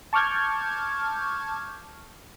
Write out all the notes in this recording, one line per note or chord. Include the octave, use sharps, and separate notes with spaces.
A5 C#6 D6 F6 G6 G#6